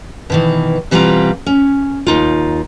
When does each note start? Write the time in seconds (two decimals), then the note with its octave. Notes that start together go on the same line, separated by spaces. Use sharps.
0.30 B2 D#3 E3
0.91 B2 E3 G3 C4 F4 A#5
1.46 C#4
2.07 D#2 D#4 F4